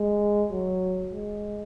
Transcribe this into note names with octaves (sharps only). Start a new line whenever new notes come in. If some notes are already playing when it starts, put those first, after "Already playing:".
Already playing: G#3
F#3
G#3